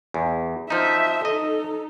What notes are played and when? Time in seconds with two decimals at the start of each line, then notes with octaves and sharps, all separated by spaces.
0.14 E2
0.70 F3 D#4 E5
1.25 D#4 A4 D#5